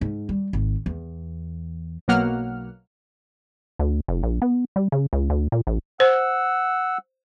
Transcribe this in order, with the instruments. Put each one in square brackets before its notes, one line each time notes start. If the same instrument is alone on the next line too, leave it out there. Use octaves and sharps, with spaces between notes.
[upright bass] G#2
G3
G#1
E2
[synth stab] B1 B2 F#3 A#3 F#5 F6
[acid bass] D2
F1
A#1
B3
G3
C#3
C#2
D2
A#2
A1
[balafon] C5 [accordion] F#5 E6